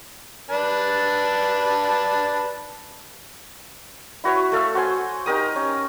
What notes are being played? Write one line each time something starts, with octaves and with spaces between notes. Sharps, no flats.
D4 B4 A5
E4 F#4 B4 C#5
A3 A4 F5 E6
F#4 C5 F#5 G#5
D#4 G4 A#4 D#6
C#4